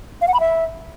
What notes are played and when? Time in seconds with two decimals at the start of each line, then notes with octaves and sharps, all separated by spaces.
0.22 F5
0.28 F#5
0.34 B5
0.40 E5